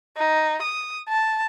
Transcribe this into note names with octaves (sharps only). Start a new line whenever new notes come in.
D#4
D#6
A5